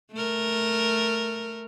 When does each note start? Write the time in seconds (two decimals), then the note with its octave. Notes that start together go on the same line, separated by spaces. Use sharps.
0.13 A3 A#4